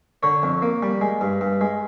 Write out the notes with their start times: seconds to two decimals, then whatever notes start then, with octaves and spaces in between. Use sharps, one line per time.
0.23 D3 C#5
0.43 F2
0.62 A#3
0.82 G3
1.01 G#3
1.21 G2
1.41 G2
1.61 G#3